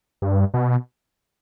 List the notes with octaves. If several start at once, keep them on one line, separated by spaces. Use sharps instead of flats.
G2
B2